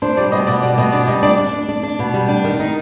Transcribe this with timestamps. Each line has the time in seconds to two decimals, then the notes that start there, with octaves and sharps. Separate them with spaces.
0.02 D4 C5
0.17 G3 D5
0.32 B2 D#5
0.47 B2 D5
0.62 G3 D5
0.78 B2 D#5
0.92 D4 D5
1.08 G3 D#5
1.23 D4 D5
1.38 D4
1.53 D4
1.69 D4
1.83 D4
1.99 B2
2.14 G3
2.28 D4
2.44 D#3
2.60 D#4